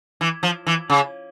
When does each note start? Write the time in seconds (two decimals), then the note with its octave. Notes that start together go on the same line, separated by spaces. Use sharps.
0.21 E3
0.43 F3
0.67 E3
0.90 C#3